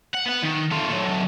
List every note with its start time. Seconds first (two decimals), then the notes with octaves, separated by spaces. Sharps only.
0.14 F#5
0.26 B3 F#5
0.43 D#3
0.71 A3 F4
0.89 F#3 A3